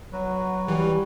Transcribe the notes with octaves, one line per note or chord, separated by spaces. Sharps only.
F#3 F#4 B4
E3 G3